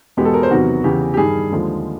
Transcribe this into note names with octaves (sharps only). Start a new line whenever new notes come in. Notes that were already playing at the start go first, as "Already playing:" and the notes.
E2 B2 G#3 B3 G4
A4
A#4
C5
E2 C3 D#3 F#3 B3 F#4
E2 C#3 E3 G4
G4
G2 D#3 G3 G#4
D#2 D3 F3 G#3